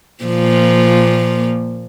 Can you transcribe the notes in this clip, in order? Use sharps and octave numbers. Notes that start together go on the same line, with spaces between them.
A#2 F3 A#3